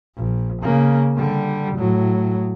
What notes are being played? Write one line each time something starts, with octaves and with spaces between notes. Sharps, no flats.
A#1
C#3 A#3
D3 G3
A2 F#3